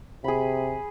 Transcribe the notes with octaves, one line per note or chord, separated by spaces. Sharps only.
C3 G#4 B5